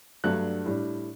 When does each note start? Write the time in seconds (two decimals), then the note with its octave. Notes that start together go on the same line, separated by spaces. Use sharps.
0.24 G2 F#3 A3 D4 F#6
0.66 A2 G3 D4